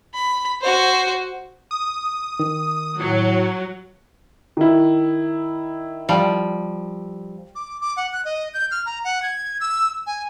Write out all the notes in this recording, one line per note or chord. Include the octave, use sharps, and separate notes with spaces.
B5
F#4 C5
D#6
D#3
A2 F#3
D#3 E4
F3 G3
D6
D6
F#5
F#6
D#5
G6
F6
A#5
F#5
G#6
E6
G#5